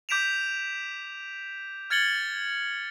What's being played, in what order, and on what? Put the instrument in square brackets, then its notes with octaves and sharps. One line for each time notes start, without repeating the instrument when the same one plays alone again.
[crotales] D6 G6 B6 D7 E7 F7
F6 G#6 A6 C#7 F#7 G7